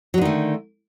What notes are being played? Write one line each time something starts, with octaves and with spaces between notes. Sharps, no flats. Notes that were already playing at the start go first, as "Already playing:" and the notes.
D3 D#3 F#3 A3